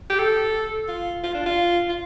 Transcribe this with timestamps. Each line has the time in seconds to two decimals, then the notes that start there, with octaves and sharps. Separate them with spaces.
0.10 G4
0.19 A4
0.88 F4
1.24 F4
1.34 D4
1.46 F4
1.89 F4